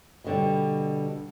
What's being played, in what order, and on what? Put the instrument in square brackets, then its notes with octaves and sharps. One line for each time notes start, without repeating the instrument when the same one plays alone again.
[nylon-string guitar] B2 D3 G3